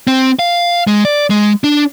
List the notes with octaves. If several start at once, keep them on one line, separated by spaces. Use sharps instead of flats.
C4
F5
G#3
D5
G#3
D4